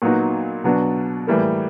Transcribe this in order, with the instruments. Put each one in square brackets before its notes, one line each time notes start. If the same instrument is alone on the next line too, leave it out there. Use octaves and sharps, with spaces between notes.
[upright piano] A#2 F#3 B3 D#4 F#4
B2 F#3 B3 D4 F#4
A2 E3 G3 A#3